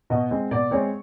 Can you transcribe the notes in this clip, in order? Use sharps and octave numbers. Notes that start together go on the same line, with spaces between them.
B2 D#5
G#3 C4
B2 D5
G#3 C4 C#5